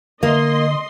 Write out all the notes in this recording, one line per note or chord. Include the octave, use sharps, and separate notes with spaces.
D3 A#3 D#5 C6